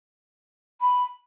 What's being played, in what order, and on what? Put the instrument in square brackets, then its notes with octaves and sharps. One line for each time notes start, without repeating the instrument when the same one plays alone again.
[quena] B5